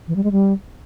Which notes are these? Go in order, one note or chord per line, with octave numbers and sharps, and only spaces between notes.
E3
G3
G#3
G3